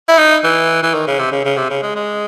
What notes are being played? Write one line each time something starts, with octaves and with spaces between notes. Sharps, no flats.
E4
D#4
E3
E3
D#3
C#3
C3
C#3
C#3
C3
C#3
G#3
G#3